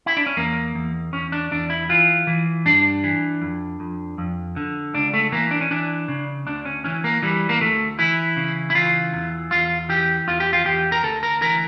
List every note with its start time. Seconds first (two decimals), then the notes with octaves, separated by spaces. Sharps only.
0.06 E4
0.17 D4
0.26 C#4
0.37 E2 A#3
0.75 E2
1.13 E2 C#4
1.32 D4
1.51 E2 D4
1.70 E4
1.89 E3 F4
2.27 E3
2.65 G2 D4
3.04 E3
3.41 F2
3.80 F2
4.18 F2
4.56 D3
4.94 C#2 D4
5.14 A3
5.32 E3 A#3
5.51 D4
5.61 C#4
5.70 E3 D4
6.08 C#3
6.46 D2 D4
6.65 C#4
6.84 E3 C#4
7.04 A#3
7.22 E3 G3
7.49 A#3
7.60 D2 A3
7.99 E3 E4
8.37 C#3
8.70 E4
8.75 E3 F4
9.13 E2
9.51 E2 F4
9.89 E3 G4
10.28 E2 F4
10.40 G4
10.53 F4
10.65 E2 G4
10.92 A#4
11.03 D2 A4
11.23 A#4
11.41 E3 A#4